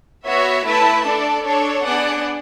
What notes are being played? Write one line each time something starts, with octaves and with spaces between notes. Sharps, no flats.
B3 F#4 C#5 E5
A3 E4 B4 E5 A5
D4 A4 D5
D4 A4 C#5
B3 D4 G#4 D5 F#5